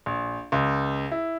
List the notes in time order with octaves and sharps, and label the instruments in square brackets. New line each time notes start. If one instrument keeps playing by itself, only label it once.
[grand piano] A#1
C#2
E4